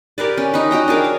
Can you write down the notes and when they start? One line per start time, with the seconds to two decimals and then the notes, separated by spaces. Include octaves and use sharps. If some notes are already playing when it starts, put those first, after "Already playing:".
0.18 G4 A#4 B4 D5
0.37 C#4
0.54 D#4 B4
0.71 D#4 F#4 G5 A#5
0.88 D4 G#4 A#4 D6
1.05 C#5